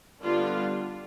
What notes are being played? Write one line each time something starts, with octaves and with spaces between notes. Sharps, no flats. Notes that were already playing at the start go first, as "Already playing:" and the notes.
D3 G3 B3 D4 F4